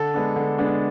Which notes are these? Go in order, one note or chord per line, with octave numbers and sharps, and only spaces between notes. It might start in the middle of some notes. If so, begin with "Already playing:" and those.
Already playing: D3 A4
G#3 B3 D4
D3
G#3 B3 D4